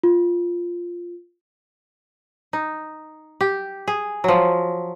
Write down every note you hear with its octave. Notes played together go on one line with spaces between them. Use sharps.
F4
D#4
G4
G#4
F3 F#3